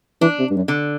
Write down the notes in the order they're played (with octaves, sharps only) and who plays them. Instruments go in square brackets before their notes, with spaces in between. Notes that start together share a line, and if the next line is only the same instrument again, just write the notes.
[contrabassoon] E3 [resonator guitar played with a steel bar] D4
[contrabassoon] C3
G2
F#2
[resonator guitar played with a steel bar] D3